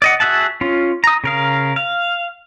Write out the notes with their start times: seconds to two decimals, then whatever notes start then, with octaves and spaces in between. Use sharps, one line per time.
0.02 D5 D#5 F#5
0.20 F#4 G#4 E5 F#5 A5
0.61 C#4 F4
1.04 A#5 D#6
1.24 C#3 A#4 F5
1.76 F5